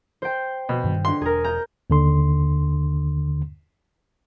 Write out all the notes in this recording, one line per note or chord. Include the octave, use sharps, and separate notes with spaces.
C5 G5
B2
G2 D#3 G3
D3 C6
E1 G#4 A#4
A#5 G6
D#2 D3 C6